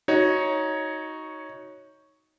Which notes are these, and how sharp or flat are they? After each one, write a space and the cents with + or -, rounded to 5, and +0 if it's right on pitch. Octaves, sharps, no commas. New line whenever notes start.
D#4 +15 F#4 +0 C#5 +0